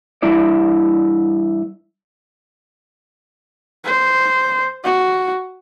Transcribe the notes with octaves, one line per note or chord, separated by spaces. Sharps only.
G2 E3 E4 D5
C5
F#4